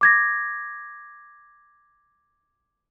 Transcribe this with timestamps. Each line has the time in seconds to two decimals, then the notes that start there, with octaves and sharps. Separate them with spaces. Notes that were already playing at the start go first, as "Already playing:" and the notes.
0.01 D6 G#6 A#6